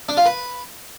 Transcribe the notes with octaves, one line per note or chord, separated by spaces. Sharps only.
D4
F4
B4